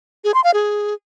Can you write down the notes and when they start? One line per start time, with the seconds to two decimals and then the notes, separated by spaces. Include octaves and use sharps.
0.24 G#4
0.34 C6
0.44 F5
0.54 G#4